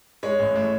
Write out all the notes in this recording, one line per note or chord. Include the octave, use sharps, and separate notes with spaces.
G#3 C#5
A1
A2